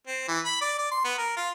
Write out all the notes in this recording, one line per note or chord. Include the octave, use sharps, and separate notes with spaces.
C4
E3
B5
D5
D5
C6
B3
A#4
F4